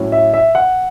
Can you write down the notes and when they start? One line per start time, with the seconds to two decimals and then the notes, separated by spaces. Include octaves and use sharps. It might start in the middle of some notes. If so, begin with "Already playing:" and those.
Already playing: A2 F#3 C#4 E4
0.12 E5
0.34 E5
0.55 F#5